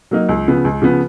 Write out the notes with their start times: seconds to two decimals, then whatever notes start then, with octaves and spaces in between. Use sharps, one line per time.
0.11 F#3 A#3 D#4
0.29 C#2
0.47 C#3 F3 B3
0.65 C#2
0.82 C#3 F3 B3